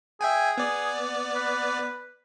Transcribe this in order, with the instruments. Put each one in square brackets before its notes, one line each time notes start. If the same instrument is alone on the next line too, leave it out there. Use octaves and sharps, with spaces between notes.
[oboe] G#4 [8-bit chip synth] E5 G5 G#5
[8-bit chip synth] B3 D5
[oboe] B4